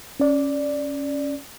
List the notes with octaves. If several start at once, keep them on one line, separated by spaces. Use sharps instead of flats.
C#4 D5